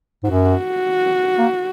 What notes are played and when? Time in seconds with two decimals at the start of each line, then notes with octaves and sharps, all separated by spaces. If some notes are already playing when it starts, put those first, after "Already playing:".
0.23 G#2
0.30 F#2 F#4
1.38 A#3